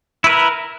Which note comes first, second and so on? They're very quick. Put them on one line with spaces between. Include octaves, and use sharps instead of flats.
E4 B4 A#4